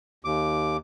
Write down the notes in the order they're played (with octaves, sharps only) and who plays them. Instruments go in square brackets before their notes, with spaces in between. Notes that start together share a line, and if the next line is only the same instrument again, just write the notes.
[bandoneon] D#2 D6